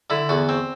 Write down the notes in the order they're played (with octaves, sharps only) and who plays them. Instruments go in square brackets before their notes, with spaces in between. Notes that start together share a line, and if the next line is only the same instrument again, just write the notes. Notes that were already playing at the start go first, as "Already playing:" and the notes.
[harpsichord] D3 E4
E2 F#4
C4